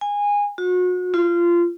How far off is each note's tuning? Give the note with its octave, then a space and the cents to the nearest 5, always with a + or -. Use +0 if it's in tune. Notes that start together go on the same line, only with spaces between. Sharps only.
G#5 -20
F#4 -35
F4 -20